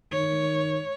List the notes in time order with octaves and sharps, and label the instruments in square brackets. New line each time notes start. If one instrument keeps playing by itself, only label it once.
[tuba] D#3 [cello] C#5